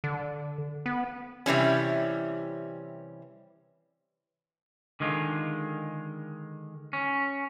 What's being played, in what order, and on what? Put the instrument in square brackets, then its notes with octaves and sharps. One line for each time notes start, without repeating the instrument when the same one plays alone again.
[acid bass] D3
B3
[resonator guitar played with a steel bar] C3 E3 G3 C#4
[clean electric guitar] D3 D#3 G#3 F4
C#4